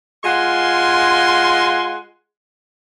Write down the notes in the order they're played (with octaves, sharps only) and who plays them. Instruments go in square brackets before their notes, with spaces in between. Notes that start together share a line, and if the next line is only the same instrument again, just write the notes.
[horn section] G#3 F4 F#5 G#5 C6